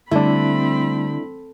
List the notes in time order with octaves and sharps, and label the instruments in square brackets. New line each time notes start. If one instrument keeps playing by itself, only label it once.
[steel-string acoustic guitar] D3 [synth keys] G3 A3 [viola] C4 B5 [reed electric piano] D4 E4